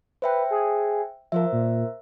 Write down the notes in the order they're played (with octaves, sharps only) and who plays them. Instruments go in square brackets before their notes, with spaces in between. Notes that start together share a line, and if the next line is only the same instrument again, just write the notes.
[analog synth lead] B4 [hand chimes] C5 E5 G5
[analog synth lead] G#4
[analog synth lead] F3 [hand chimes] A#4 C5 E5
[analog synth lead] A#2